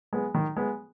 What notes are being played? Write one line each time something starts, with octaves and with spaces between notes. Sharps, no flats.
G#3 B3
D#3
G#3 B3